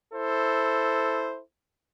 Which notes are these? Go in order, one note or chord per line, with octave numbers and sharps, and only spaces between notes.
E4 A4 C5